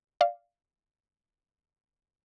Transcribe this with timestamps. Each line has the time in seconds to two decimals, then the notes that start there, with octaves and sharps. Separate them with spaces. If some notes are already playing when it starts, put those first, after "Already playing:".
0.21 D5 F5